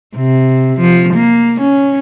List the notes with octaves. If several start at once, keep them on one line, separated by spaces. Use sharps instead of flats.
C3
F3
A#3
C#4